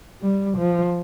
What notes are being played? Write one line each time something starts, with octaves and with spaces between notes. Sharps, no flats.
G3
F3